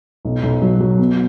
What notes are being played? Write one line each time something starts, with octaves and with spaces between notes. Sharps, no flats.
B1
B1
F#3
F#3
B2